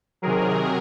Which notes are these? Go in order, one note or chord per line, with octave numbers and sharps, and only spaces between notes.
C3 D#3 F#3 G#4 A#4